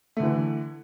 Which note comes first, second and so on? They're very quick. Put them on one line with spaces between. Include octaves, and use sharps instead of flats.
A3 D3 E3